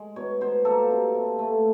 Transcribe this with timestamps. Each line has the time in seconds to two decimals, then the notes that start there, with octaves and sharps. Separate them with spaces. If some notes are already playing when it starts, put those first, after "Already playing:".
Already playing: G#3
0.16 B2 C#5
0.41 B2 C5
0.65 A#3 A4
0.90 C3
1.15 C3
1.39 A3